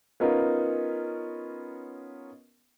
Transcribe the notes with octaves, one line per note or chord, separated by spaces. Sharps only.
B3 C#4 D#4 F4 A#4